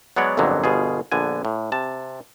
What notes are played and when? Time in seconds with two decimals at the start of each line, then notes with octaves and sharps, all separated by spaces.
0.16 F#3 G#3 B3 C#5 D5 F#5
0.37 G1 F2 A#2 D3 F#3 D#4
0.64 G1 B2 F4 G#4
1.12 A#1 D3 B3 G#5
1.45 A2
1.72 C3 A5